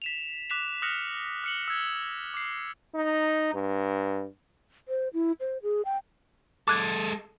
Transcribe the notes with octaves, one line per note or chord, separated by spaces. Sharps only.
B6 E7 F7
D6 F#6 B6 E7 F7
D#6 F6 F#6 A#6 C#7 F7
F6 C#7 F#7
E6 G#6
D6 C7
D#4
G2
C5
E4
C5
G#4
G5
G#3 A4 D6 F#6 G#6